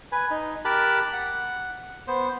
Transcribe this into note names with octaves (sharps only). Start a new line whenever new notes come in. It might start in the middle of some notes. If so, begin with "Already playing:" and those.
B4 G#5
D#4
G4 A#4 A5 B5 F#6
F#5
B3 C5